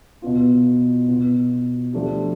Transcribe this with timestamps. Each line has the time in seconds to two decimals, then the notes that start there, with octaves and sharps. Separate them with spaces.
0.22 B2 B3 F4
1.08 B2 B3 F4
1.93 F3 A3 D4 G4